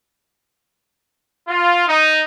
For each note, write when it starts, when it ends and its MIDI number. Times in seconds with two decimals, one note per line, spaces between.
1.48 1.86 65
1.87 2.22 63